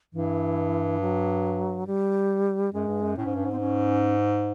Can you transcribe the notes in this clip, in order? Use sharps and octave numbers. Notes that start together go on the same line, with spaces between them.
G2 E3
F#3
G3
F#2 G#3
G2
F#2
A2 C#4
G#2
G2
G#2
C4
C#4